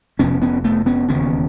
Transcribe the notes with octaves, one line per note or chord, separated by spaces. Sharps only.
F1 F2 C3 B3 C#4
B3 C#4
A3 B3
B3 C#4
E1 D#2 C#3 B3 C#4